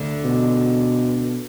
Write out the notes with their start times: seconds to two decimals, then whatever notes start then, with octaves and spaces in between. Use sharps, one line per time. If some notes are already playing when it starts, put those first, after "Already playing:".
Already playing: D2 D3
0.24 B2